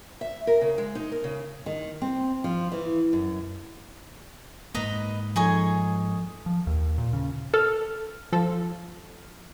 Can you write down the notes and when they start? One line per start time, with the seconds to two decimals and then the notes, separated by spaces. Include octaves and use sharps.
0.21 E5
0.47 A#4
0.61 C#3
0.78 G#3
0.95 D#4
1.12 A#4
1.24 C#3
1.66 D#3
2.02 C4
2.44 F3
2.72 E3
3.13 F#2
4.74 G#2 A#3 B4 D#5 A#5
5.36 F3 D#4 G#4 A4 C#5
6.46 F3
6.67 D#2
6.98 A#2
7.13 C#3
7.54 A4 F6
8.32 F3 A4